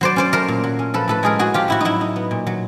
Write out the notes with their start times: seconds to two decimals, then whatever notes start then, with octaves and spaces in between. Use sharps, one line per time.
0.01 F#3 C5 D5
0.16 C#4 C5 D5
0.33 A3 A#4 C5
0.48 A#2
0.64 F#3
0.79 C#4
0.94 F3 A4 B4
1.08 A2 A4 B4
1.23 G#3 G#4 A#4
1.39 A2 F#4 G#4
1.54 F3 F4 G4
1.68 A2 E4 F#4
1.80 F#3 D#4 E4
2.01 D#4
2.16 B3
2.31 A#2
2.47 F#3